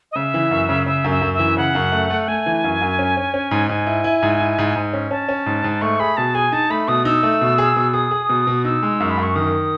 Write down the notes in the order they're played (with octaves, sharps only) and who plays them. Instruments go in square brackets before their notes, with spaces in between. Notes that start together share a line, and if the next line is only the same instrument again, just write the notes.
[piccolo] D#5
[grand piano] C#3 [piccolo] E5
[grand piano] E3
F#2
C#3
[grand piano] C#3 [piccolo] E5
[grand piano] F#2
[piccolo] E5
[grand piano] F#2
[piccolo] E5
[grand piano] E3
[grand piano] C#3 [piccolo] F#5
[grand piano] F#2
A3
A3
[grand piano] A3 [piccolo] G#5
[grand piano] E3
F#2
F#2
C#4
C#4
C#4
G#2
[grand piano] G#2 [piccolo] G#5
[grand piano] E4
E4
G#2
E4
G#2
G#2
C#4
[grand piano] C#4 [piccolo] A5
[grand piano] C#4
G#2
G#2
[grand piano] A3 [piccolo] C#6
[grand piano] G#4 [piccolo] B5
[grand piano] B2 [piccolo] A5
[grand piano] G#4 [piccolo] G#5
[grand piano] D#4 [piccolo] A5
[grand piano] A3 [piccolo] B5
[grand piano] B2 [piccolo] D#6
[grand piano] D#4 [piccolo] E6
[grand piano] A3
B2
G#4
B2
[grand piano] G#4 [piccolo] D#6
[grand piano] G#4
B2
B2
[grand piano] D#4 [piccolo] E6
[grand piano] G#3
F#2
[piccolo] B5
[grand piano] F#2
[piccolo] C#6
[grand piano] D#3 [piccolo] D#6